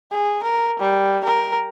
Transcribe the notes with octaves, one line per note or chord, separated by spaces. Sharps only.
G#4
A#4
G3
A#4